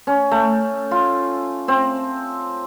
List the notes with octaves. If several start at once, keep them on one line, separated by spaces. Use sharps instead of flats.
C#4
A3
F4
C4